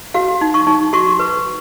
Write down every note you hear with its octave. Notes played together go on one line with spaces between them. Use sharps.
F#4 F5
D#4
C#6
D#4
F#4 C#6
B4